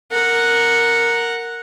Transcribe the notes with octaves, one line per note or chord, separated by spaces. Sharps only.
A#4 F#5